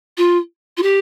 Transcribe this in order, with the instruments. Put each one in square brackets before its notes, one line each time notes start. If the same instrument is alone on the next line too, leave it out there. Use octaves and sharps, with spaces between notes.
[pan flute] F4
F4
G4